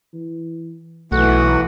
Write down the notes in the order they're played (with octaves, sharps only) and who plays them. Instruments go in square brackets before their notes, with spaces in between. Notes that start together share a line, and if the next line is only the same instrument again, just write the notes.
[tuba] E3
[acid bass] B1 [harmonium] E3 [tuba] A3 [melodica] F#4 F#5